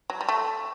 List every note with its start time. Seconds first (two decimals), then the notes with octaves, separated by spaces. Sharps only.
0.10 F#3
0.21 G3
0.29 A3